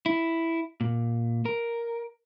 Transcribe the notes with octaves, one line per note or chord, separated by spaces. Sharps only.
E4
A#2
A#4